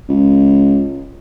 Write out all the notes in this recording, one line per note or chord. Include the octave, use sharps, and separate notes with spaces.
C#2